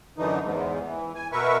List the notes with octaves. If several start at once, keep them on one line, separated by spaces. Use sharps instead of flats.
F#2 D3 E3 D#4
E2 G#2
E3
G#5
B2 A#4 B4 E5 C#6